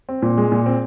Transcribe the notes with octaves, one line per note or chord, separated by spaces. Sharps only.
C4
A#2
G#3
A#2
C4